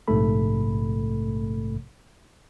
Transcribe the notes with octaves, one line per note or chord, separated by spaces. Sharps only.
A#1 G#2 C3 A3 A4 B5